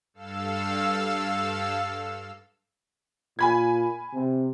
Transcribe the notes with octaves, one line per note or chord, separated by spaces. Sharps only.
G2 A4 F5 E6
A#2 G#5 B5 G#6
C3